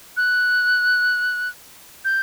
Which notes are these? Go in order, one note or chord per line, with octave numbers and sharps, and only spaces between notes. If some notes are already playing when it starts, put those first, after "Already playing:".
F#6
G6